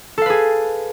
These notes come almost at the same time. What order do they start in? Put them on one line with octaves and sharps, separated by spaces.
A4 F5 B4 G#4